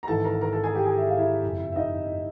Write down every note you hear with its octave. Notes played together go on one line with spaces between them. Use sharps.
A#5
G#1 G#2 E3 A4 A5
A#4 A#5
A#4 A#5
A4 A5
G#4 G#5
G4 G5
G#4 G#5
E5
F5
E4 E5
F#1 F2 C#3
E5
D#4 D#5